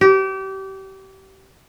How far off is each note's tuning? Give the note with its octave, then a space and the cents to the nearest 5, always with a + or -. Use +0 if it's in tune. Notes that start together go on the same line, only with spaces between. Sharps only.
G4 -30